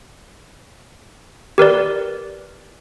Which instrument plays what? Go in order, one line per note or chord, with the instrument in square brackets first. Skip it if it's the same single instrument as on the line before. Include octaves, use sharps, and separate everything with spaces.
[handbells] G4 A#4 B4 D5